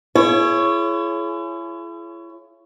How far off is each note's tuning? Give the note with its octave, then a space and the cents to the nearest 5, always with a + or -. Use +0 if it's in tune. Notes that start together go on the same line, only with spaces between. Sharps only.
E4 +40 G#4 +35 C#5 +0